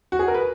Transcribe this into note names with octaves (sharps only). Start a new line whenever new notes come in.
F#4
G#4
A#4
B4